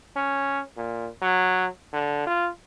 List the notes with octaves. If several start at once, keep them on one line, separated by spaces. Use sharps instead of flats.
C#4
A#2
F#3
D3
F4